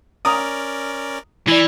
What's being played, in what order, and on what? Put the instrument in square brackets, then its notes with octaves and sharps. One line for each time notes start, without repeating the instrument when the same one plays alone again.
[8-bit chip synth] C#4 A#4 D5 [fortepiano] A#5 D#6
[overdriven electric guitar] E3 [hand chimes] E4 D5 [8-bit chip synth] G#5